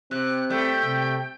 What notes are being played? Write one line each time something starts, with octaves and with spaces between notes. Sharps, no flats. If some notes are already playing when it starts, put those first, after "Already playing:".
C3 C4 F#6
G3 A3 G5
C3